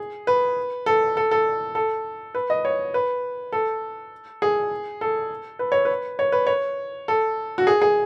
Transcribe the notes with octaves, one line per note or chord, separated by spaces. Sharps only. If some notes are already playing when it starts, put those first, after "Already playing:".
Already playing: G#4
B4
A4
A4
A4
A4
B4
D#5
C#5
B4
A4
G#4
A4
B4
C#5
B4
C#5
B4
C#5
A4
F#4
G#4
G#4